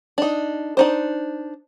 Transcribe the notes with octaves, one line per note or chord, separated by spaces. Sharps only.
D4 D#4
D4 D#4 C5